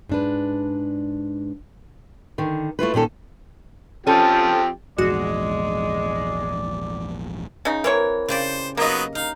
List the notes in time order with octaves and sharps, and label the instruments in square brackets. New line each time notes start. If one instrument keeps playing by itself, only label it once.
[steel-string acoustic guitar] G#2 D4 B4
D3 D#3
A3 E4 F4 B4
A#2 D#3 C#4 A4
[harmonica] F3 C4 G4 [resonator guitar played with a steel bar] C#4 A4
[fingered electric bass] A#1 E2 G#2 [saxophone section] G#3 [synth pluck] F#4 [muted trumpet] D5
[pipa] C#3 D#4
[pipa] E3 C#5 [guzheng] C4 A#4
[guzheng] C#3 G4 D5 [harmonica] C5
[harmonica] F#3 B3 D#4 [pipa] A#3 D#5
[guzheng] D#4 [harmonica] F5